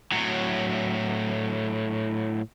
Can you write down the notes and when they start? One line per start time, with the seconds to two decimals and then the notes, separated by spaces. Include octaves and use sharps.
0.12 A2 F#3